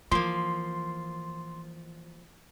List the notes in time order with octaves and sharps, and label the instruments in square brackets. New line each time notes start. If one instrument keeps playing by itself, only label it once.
[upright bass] E3 [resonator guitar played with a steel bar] F3 A#3 [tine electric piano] C6